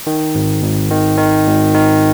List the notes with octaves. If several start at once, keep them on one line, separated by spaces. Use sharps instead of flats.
D#3
G#1
G#1
D#3
D#3
G#1
D#3